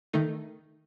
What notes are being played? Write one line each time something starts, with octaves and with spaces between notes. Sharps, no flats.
D#3 A3 D#4